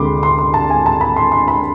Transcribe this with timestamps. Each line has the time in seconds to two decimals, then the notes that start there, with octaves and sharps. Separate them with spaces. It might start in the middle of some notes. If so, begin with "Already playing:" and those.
Already playing: D2 C3 G#3 D4 B5 C6 D6
0.23 C6
0.39 C6
0.54 A5
0.70 G#5
0.86 A5
1.01 B5
1.16 C6
1.32 C6
1.48 B5